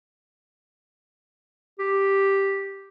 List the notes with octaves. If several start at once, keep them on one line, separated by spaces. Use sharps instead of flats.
G4